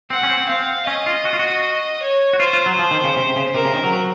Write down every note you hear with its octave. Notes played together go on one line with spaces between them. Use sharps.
C4 F#5
C#4
C4
C4 F5
C#4 D#5
F4
F#4
F4
F#4
C#5
F#4
F4 C5
F4
F#3
F3
D#3
C#3
C3
C#3
C3 A#4
C#3
D#3
F#3